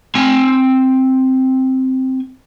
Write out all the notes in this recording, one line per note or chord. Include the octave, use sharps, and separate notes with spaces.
C4 G#5